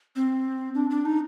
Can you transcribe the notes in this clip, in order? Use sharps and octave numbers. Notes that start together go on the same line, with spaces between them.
C4
D4
D4
D#4